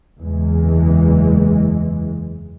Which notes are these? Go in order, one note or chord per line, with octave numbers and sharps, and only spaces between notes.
F#1 E2 E3 G#3